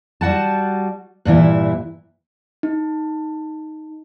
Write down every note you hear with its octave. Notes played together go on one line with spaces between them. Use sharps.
G3 F#4 F#5 A5
G2 A#2 E3 E4
D#4